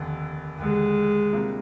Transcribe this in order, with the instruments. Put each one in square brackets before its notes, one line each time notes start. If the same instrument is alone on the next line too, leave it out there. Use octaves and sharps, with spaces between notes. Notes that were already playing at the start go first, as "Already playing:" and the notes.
Already playing: [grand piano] F1 D#2 D3
[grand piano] F1 D#2 D3 [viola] G#3
[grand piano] C3 G3 A#3 D4 F4